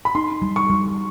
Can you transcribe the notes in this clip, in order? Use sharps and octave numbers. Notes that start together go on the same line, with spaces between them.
B5
D#4 C6
G3
C#6
G3